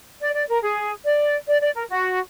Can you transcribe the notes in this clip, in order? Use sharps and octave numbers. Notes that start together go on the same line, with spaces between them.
D5
D5
A#4
G#4
D5
D5
D5
A#4
F#4